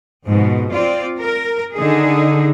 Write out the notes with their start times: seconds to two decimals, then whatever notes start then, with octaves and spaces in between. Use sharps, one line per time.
0.25 F2 G#2 B2
0.73 C4 F4 D5
1.19 A#4
1.74 D3 D#3 D#4 G#4